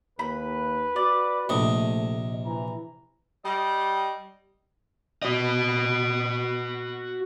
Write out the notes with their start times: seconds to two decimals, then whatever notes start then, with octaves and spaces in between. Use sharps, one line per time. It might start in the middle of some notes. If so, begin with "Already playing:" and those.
0.19 D#2 B4 B5
0.96 F#4 D5
1.49 A#1 C3 A3 D#5
2.46 E3 A#5
3.45 G3 D#5
5.23 F#4 D#5